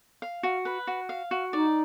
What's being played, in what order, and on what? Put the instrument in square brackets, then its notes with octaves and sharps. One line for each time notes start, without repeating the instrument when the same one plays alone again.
[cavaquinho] F5
F#4
B4
F#4
F5
F#4
[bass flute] D#4 [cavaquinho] D5